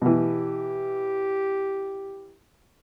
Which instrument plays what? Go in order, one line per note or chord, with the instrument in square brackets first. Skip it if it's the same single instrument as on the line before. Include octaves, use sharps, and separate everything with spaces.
[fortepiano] B2 E3 [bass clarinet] G4